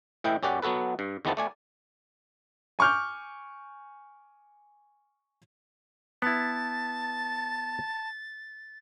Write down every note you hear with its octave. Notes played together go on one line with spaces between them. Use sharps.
A2 E3 E4 D#5 G5
F#2 C#4 G4 D5 F#5
F#3 B3 F#4 A4 B4
G2
E2 D#3 E3 B3 C4 A5
A3 D5 G#5
G#5 C#6 D6 F6 G6
B3 E4 A5 A6